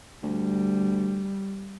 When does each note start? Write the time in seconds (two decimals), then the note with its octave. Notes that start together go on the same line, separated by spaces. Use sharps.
0.23 D2 G3